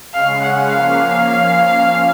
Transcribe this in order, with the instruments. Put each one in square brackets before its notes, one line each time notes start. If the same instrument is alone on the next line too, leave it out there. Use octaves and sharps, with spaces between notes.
[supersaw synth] C#3 G#3 C#4 [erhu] F5
[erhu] F#5
[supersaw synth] F3 A#3 C#4 [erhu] F5